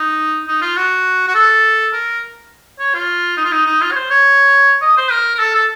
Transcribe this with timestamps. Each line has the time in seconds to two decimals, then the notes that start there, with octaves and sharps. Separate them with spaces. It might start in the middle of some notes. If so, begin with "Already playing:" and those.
Already playing: D#4
0.48 D#4
0.62 F4
0.77 F#4
1.28 F#4
1.35 A4
1.93 A#4
2.80 C#5
2.95 F4
3.37 D#4
3.45 F4
3.52 D#4
3.66 D#4
3.81 F4
3.91 C#5
3.96 C5
4.10 C#5
4.82 D#5
4.97 C5
5.12 A#4
5.35 A#4
5.40 A4
5.55 A4